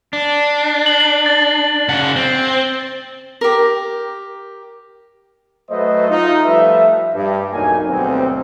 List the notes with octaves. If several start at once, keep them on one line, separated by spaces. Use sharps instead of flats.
D4
F#7
A6
C#3 F#5
C4
G4 A#4
F#3 A3 B4 C5 D#5
D#4 F4
F3 G3 A3 B4 E5
G2
B1 E2 F#3 A#3 D#4 G#5
D2 G2 B2 F#3 C4